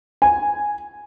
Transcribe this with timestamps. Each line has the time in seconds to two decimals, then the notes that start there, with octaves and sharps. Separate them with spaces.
0.22 G#5